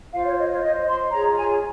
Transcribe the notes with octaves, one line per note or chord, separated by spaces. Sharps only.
F4 C5 F5
C#5
D#5
C#5
F4 C5 D#5
C6
F4 G#4 C#5 A#5
G#5